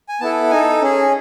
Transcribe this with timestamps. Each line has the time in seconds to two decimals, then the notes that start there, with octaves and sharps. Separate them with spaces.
0.09 G#5
0.20 B3 E4 A4 A5
0.51 D#4 A4 G#5
0.82 C#4 G#4